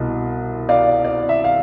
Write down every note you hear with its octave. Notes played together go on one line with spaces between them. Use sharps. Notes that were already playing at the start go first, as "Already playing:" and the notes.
Already playing: C2 B2
D5 F5
D5
E5
F5